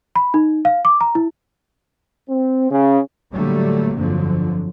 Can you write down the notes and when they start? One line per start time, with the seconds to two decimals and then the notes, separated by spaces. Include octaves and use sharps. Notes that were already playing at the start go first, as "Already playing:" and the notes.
0.16 B5
0.34 D#4
0.65 F5
0.85 D6
1.01 A#5
1.15 E4
2.29 C4
2.71 C#3
3.33 A2 D3 F#3 G3 A3 A#3
3.96 G1 F2 D3 F3 F#3